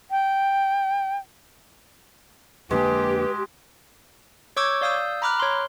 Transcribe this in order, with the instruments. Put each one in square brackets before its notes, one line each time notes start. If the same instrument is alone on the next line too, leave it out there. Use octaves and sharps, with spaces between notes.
[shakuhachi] G5
[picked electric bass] F2 D3 A#3 [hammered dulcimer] G#3 [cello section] G4 [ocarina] B4
[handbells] C#5 C#6 D6 E6 G6 G#6
D5 F5 D#6 E6 G6
A#5 B5 D6 F6 F#6
C#5 C6